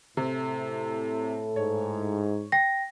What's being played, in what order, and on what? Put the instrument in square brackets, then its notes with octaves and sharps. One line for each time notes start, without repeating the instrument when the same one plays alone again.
[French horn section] A2 E4 A4 [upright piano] C3
[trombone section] G#2 [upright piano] C#5
[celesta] G5 A#6